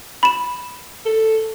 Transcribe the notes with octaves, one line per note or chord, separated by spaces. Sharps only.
B5 E7
A4